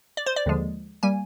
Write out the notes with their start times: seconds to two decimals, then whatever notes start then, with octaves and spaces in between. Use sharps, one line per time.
0.17 D5
0.26 C5
0.36 D5
0.46 D#2 D3 F3 G#3
1.03 G3 A#3 G#5